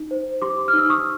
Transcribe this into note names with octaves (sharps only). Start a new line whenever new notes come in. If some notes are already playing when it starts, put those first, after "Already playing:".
Already playing: D#4
C5
G4 C6 D6
F6
D#4
E6
C#6 D#6